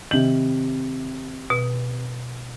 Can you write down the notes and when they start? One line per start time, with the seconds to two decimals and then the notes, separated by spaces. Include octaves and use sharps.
0.11 C3 D#3 F#7
1.50 B2